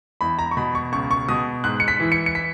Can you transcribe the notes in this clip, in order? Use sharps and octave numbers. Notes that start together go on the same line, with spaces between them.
E2 B5
A#5
C#6
B2 B5
C#6
C#2 C#6
C#6
B2 D#6
G#2 F#6
C#7
B6
E3
C#7
C#7
B6